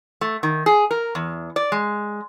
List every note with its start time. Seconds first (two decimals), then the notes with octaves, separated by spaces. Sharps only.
0.21 A3
0.43 D#3
0.66 G#4
0.91 A#4
1.15 E2
1.56 D5
1.72 G#3